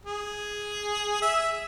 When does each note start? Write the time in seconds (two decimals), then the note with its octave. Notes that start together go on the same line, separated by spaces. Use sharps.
0.06 G#4
1.22 E5